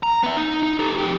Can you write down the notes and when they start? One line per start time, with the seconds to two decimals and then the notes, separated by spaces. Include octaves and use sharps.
0.03 A#5
0.23 B3 E5
0.37 D#4
0.63 D#4
0.79 G4 A4
0.98 F2 G4